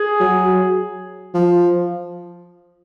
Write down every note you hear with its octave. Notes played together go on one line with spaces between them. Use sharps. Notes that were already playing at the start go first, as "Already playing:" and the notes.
Already playing: G#4
F#3
F3